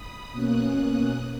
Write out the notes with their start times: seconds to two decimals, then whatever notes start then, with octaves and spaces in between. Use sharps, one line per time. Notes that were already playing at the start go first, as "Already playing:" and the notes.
Already playing: B5 D#6
0.32 B2 A#3 C#4 D#6 F#6